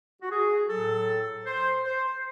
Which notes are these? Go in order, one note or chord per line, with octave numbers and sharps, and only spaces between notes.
F#4
G#4
A2 F#3 A4
C5
C5